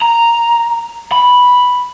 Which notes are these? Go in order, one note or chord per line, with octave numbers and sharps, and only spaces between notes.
A#5
B5